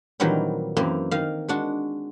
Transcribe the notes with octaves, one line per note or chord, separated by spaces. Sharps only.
A#2 D#3 E3 F#3 G3 C4
F#2 E3 A#3 C4
D#3 F5
G#3 D4 F#4